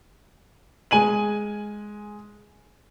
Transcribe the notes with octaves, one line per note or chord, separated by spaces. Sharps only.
G#3 G#5 D#7 F#7